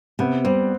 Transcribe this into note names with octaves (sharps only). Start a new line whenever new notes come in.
C3 B3
G3 C4